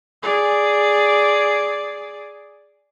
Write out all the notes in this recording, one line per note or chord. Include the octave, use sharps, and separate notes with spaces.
G#4 D5